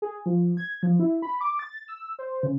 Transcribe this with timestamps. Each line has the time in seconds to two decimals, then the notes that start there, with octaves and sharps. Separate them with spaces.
0.02 G#4
0.26 F3
0.57 G#6
0.83 F3
1.00 E4
1.22 B5
1.41 D6
1.59 A6
1.88 E6
2.19 C5
2.43 C#3